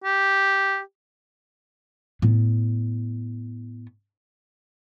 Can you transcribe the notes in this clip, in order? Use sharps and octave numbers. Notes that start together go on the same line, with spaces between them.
G4
A2 B3